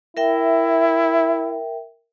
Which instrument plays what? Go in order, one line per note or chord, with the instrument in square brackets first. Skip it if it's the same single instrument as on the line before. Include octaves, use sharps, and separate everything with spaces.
[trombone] E4 [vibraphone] A#4 E5 G5